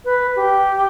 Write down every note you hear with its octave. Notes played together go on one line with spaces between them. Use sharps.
B4
G4